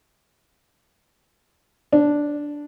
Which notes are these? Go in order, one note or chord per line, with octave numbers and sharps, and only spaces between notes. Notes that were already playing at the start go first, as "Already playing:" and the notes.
D4